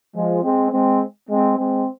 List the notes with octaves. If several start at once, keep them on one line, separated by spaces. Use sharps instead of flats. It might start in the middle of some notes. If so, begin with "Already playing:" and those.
F3 G#3
G#3 C4
G#3 C4
G#3 C4
G#3 C4